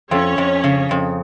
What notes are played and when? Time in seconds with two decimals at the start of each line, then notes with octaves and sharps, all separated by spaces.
0.11 F2 C#4 C#5
0.38 F2
0.64 C#3
0.91 F2